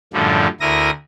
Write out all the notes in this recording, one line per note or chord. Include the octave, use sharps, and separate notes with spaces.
F#2 A2 D3 F3 G3
D2 E4 A#4 D#6 A#6